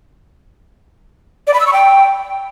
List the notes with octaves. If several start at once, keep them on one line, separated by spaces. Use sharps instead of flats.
D5
B5
E6
C#6
G5